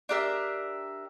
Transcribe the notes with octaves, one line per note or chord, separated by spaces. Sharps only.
D4 G4 A#4 E5